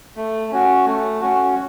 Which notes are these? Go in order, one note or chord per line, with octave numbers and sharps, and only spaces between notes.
A3
C#4 F#4
A3
C#4 F#4